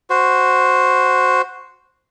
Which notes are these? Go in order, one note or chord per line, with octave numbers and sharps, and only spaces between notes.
F#4 C5